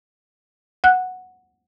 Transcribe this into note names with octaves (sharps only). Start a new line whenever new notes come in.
F#5 F#6